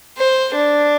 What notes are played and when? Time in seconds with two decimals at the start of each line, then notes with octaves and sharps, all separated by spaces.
0.18 C5
0.54 D4